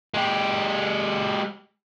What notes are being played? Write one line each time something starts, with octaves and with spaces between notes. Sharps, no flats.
G#3 G4